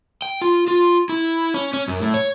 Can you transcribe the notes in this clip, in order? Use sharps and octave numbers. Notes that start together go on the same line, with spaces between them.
G5
F4
F4
E4
C#4
C#4
F#2
A2
C#5